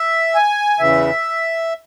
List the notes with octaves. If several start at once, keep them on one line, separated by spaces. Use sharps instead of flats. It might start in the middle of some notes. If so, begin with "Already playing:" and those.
Already playing: E5
G#5
E2 C#3 E3 E5